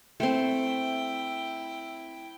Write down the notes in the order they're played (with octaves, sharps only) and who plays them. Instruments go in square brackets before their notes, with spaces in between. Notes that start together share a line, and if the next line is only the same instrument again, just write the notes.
[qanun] A3 C4 [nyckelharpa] E4 G5